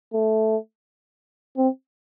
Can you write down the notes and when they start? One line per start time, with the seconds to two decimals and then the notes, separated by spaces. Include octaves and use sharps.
0.13 A3
1.57 C4